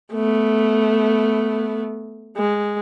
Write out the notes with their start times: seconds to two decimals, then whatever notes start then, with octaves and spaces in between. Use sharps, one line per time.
0.13 A3 B3
2.37 G#3